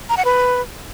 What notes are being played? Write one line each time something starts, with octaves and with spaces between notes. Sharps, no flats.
A#5
F#5
B4